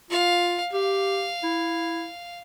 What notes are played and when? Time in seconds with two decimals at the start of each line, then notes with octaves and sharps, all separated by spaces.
0.11 F4 F5
0.73 G4 F5
1.43 E4